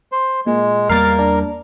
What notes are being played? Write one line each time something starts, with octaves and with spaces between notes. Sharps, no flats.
C5
A#2 G#3
E2 G3 A#3 A#4 F5 A6
D4